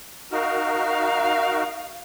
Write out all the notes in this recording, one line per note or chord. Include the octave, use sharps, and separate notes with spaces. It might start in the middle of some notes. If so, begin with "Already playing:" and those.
D#4 F#4 A#4 F5